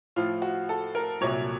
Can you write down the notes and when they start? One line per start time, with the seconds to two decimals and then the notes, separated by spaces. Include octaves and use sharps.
0.16 A2 F3 F4
0.42 F#4
0.69 A4
0.95 A#4
1.21 C2 A#2 F#3 C#5